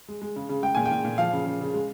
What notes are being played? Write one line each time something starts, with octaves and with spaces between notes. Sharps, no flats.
G#3
G#3
C#3
C#3
G#3 G5
A#2 G#5
G5
A#2
A#2
F3 F5
C#3
C#3
C#3
G#3